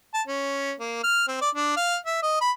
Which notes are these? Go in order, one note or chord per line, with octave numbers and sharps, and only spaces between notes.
A5
C#4
A#3
F6
C4
D5
D4
F5
E5
D#5
B5